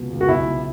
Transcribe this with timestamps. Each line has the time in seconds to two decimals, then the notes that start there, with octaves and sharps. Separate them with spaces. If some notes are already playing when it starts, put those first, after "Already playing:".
Already playing: C#2 B2
0.11 C#2
0.21 F#4
0.28 B1 E4
0.47 B2